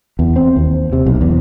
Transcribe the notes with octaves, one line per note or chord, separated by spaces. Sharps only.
E2
C4
D#2
C3
B1
E2